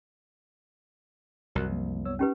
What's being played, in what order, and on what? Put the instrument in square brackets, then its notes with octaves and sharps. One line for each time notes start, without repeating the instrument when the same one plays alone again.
[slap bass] C2 F#2 [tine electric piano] F#4 A#4 F#6
[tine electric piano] F3 A#3
B3 C#5 E6
[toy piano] C#4 G4 B4 [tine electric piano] D#4